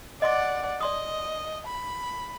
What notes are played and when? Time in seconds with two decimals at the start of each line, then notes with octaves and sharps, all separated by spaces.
0.22 D5 D#5 F#5 C6 D6
0.81 D5 D#5 C6 D#6
1.67 B5